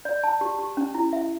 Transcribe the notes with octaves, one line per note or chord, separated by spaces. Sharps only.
D5
A5
G4
G4
C#4
E4
E5